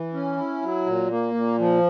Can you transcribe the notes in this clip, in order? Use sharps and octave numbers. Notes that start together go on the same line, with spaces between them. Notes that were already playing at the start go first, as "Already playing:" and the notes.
Already playing: E3
C#4
E4
F#3
A#2
A#3
A#2
F3